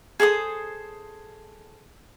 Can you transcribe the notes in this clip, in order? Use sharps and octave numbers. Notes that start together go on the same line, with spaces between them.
G#4 A4 C5 D#6